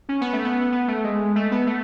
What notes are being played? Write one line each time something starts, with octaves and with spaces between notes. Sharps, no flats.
C#4
B3
A3
B3
B3
A3
G#3
A3
B3
A3